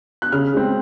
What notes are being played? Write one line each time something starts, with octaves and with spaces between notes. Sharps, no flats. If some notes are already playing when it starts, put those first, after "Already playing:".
F#6
C#3 F6
G#3 C4